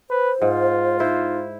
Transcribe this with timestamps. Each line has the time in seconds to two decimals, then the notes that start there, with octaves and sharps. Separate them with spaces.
0.10 B4 C5
0.42 G#2 F4
1.00 D#4 E4 C5